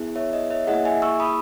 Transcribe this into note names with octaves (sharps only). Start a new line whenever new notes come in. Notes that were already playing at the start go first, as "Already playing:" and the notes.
Already playing: B3 E4 G#4
C#5 E5
D#5
C#5 E5
A#3 E4 G#4 D#5 F#5
E5 G#5
C#6 E6
B5 D#6